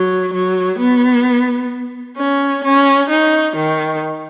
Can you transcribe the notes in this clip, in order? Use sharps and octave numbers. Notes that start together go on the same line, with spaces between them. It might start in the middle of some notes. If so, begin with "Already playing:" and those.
Already playing: F#3
F#3
B3
C#4
C#4
D#4
D#3